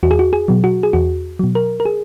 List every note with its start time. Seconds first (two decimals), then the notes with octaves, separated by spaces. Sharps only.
0.03 E2 F#4
0.11 G#4
0.19 F#4
0.33 G#4
0.48 B2 F#3
0.64 F#4
0.83 G#4
0.93 E2 F#4
1.39 B2 F#3
1.55 A#4
1.80 A#4
1.85 G#4